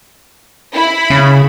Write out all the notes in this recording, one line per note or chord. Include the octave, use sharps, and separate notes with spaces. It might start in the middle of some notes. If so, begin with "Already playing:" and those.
E4 B5
C#3